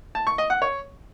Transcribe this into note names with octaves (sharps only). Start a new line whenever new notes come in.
A5
C#6
D#5
F#5
C#5